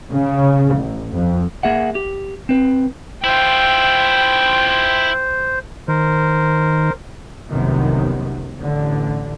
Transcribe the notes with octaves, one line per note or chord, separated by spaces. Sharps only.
C#3
A1
F2
A#3 G#4 E5 F#5
G4
C4 B4
E4 F4 C5 G5
D#3 A#4 C5
F1 C2 F#2 C3 D#3 B3
A1 D3